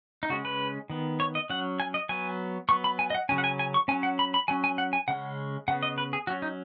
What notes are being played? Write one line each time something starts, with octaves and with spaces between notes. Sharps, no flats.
D#4
C#3 G#3 C#4 F#4
B4
D#3 B3
C#5
D#5
F#3 C#4 F#5
G#5
D#5
F#3 B3 G#5
F#3 B3 C#6
B5
G#5
D#5
F#5
C#3 F#3 C#4 G#5
F#5
G#5
G#5
C#6
F#3 C#4 G#5
F#5
B5
B5
F#3 C#4 G#5
G#5
F#5
G#5
C#3 G#3 C#4 F#5
C#3 B3 F#5
D#5
B4
G#4
F#3 C#4 F#4
D#4